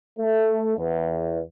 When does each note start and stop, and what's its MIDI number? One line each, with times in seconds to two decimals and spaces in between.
0.19 0.75 57
0.78 1.39 40